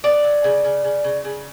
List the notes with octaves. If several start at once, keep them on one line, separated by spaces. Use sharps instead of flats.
B3 D5
F#3
C#3
C#3
C#3
C#3
C#3